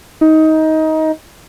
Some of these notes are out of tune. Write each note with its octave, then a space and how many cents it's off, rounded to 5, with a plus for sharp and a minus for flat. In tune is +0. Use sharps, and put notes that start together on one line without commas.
D#4 +20